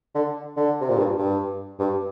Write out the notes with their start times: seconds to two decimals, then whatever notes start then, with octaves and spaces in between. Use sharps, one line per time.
0.15 D3
0.57 D3
0.81 C3
0.89 A#2
0.97 G2
1.18 G2
1.79 G2